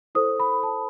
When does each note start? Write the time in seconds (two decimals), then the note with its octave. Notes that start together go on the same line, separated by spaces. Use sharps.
0.15 E4 A4 C5 D#6
0.40 B5
0.63 A5